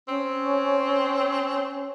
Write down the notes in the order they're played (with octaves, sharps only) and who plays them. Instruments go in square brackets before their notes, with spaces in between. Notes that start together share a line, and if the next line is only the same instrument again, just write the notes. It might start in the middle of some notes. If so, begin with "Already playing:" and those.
[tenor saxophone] C4 [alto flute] C#4